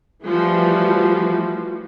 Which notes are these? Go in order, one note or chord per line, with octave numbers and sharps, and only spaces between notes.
E3 F3 G3 A3 F#4